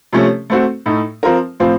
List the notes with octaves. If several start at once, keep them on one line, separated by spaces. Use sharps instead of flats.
C3 F3 A3 C#4
A3 C4 F#4
A2 A3 D#4
F3 C4 F4 A#4
A2 F3 C4 F4